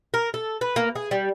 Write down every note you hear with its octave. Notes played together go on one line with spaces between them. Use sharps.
A#4
A4
B4
A#3
G#4
G3